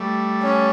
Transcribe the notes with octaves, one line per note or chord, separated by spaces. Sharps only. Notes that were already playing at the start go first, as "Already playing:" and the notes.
Already playing: G3 A3
C#4